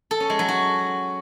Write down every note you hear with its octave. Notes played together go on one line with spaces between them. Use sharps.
A4
C#4
G#3
F#3
F#4